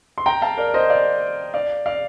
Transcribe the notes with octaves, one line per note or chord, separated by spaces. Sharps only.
C6
G5 A#5
F5 A5
A#4 D5
C5 D#5
D5 F5
D5 F5
D5 F5